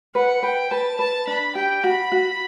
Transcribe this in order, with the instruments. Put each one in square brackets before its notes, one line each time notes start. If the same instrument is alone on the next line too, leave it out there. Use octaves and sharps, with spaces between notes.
[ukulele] B4 [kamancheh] F#5
[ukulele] B4 [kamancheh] G5
[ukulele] B4 [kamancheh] A5
[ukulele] B4 [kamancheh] A5
[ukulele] D4 [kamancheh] B5
[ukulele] G4 [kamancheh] G5
[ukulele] F#4 [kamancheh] B5
[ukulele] F#4